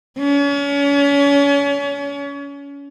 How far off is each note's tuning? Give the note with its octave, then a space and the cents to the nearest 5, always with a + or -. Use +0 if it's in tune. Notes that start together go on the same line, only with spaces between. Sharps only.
C#4 +35